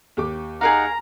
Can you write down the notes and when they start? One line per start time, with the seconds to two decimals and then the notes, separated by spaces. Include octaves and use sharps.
0.17 D#2 G4 D6
0.61 D#4 G#4 A#4 F5 F#5 A#5